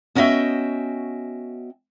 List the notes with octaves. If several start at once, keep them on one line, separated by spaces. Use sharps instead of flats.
B3 C#4 F#4 D#5 E5 G5